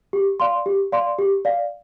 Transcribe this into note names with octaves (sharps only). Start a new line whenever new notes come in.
G4
D5 F5 C6
G4
D5 F5 C6
G4
D5 F5